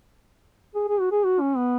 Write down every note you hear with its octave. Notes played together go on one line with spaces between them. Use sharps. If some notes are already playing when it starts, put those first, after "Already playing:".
G#4
G#4
F#4
G#4
F#4
C#4
B3